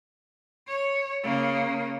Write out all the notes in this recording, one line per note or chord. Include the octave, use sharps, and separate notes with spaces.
C#5
C#3 A#3